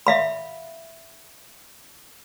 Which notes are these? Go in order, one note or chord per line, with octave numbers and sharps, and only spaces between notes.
E5 F5 B5